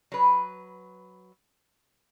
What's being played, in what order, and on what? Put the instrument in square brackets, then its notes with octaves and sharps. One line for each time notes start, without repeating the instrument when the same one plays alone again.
[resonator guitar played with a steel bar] F#3 B4